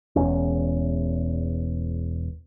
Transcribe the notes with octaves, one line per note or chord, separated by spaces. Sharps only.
E1 E2 C#4